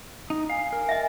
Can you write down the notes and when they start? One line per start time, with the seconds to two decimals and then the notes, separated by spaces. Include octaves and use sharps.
0.30 D#4
0.50 F5 G#5
0.73 A#4
0.89 D#5 E5